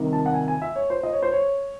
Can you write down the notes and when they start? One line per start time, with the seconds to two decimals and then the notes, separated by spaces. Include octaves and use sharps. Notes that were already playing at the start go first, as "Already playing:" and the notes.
Already playing: C2 C3 D#3
0.13 A5
0.26 F#5
0.34 G#5
0.48 G#5
0.62 E5
0.76 C#5
0.90 C5
1.03 D#5
1.13 C#5
1.23 C5
1.32 C#5